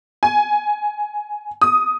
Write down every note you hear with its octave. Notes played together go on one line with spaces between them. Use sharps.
G#5
D#6